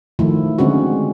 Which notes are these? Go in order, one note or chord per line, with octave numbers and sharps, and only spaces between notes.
D#3 F3 A3 E4
D3 G#3 C4 C#4 F#4